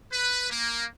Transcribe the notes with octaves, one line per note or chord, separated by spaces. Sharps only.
B4
A#3